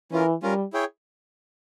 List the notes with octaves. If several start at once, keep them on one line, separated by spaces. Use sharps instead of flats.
E3 C#4 F4 A#4
G3 C#4 F4 A#4
E4 G#4 C#5 G5